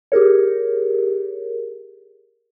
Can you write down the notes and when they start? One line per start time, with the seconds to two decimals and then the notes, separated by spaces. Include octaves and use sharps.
0.12 G4 G#4 A#4 C#5